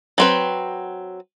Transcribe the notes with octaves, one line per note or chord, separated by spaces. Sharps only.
F#3 C4 B4